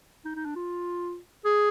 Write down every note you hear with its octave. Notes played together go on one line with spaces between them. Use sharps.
D#4
D#4
D4
F4
G#4